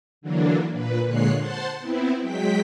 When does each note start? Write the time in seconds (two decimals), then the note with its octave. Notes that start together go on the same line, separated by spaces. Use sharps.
0.21 D3 E3 F#3 A#3 D4
0.72 A#2 B4
1.06 A#2 D3 G#3 C#5 F#6 C7
1.37 C5 F#5 A5 C6
1.80 B3 C4 E4
2.20 F#3 G#3 G5 B6